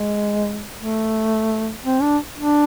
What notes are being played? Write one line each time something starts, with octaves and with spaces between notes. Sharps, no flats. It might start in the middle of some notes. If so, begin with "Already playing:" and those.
Already playing: G#3
A3
C4
D4
D4